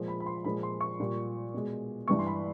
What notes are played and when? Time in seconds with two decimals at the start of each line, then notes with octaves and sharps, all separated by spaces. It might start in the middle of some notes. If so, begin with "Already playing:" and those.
Already playing: A#2 F3 G#3
0.08 B5
0.20 B5
0.26 C6
0.45 A#2 F3 G#3 B5
0.63 C6
0.81 C#6
1.00 A#2 G3
1.54 B2 G#3
2.08 G2 E3 G3 C#6
2.19 C6
2.27 B5